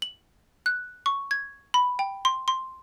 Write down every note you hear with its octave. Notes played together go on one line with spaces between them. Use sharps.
F#7
F#6
C#6
G#6
B5
G5
C6
C6